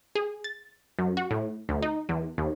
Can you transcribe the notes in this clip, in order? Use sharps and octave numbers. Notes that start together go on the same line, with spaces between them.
G#4
A6
F#2
F#4
A2
D2
D#4
E2
D#2